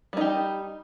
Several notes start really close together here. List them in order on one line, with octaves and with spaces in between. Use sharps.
G3 D#4 G4